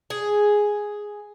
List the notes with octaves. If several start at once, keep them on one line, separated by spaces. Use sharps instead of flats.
G#4